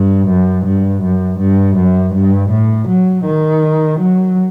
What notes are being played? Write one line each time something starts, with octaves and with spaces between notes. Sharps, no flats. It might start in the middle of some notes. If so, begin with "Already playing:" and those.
Already playing: G2
F#2
G2
F#2
G2
F#2
G2
A2
F#3
D#3
F#3